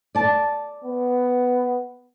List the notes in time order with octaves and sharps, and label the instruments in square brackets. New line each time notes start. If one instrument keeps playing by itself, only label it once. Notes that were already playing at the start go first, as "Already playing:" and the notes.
[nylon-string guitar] D5 A5
[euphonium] B3